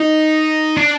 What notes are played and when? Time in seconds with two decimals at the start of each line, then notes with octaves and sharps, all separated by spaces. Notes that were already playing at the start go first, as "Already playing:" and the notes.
Already playing: D#4
0.77 D4